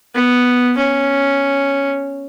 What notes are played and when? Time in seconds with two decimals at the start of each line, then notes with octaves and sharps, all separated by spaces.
0.15 B3
0.77 C#4